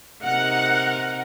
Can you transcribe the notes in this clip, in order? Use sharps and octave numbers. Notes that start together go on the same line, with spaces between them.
C3 D#4 A#4 F#5